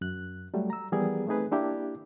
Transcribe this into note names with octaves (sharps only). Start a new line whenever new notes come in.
F#2 F#6
F#3 G3 A3
A#5 E6
E3 F3 G3 B3 G#4 A#4
A3 C4 D#4 G#4 B4
A#3 D4 E4 G4